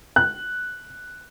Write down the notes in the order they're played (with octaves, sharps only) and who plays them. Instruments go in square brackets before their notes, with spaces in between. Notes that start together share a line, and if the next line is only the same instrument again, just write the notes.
[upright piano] F#6